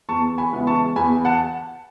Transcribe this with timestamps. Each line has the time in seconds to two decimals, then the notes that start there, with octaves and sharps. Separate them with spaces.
0.09 E2 A5 C#6
0.38 G#5 B5
0.53 C#3 E3 G#3 B3
0.67 A5 C#6
0.96 E2 G#5 B5
1.25 F#5 A5